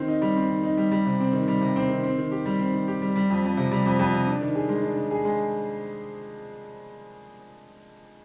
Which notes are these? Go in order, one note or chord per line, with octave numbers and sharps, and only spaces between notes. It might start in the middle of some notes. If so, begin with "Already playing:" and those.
Already playing: D#3 C4
D#4
G3
C4
D#3
D#4
G3
G3
C3
C4
D#3
G3
C3
C4
D#3
C4
D#3
G4
G3
C4
D#3
G4
G3
G3
F2
F2
C3
G3
F2
F2
C3
D4
D#3
G#4
G#3
D4
D#3
G#4
G#3